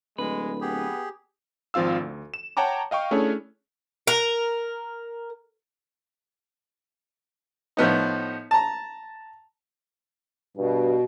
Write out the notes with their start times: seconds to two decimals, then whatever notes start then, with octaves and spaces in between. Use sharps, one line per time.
0.18 D1 G#3 B4
0.61 B3 G4 G#4
1.74 G#1 F3 C4 F4 F5 E6
2.00 D2
2.34 E7
2.57 C#5 F#5 G5 A5 A#5 D6
2.91 D#5 F5 G5 C#6
3.11 A3 C#4 D4 E4 G#4 C#5
4.07 A#4
7.77 A2 F3 B3 D#4
8.51 A5 A#5
10.57 G2 B2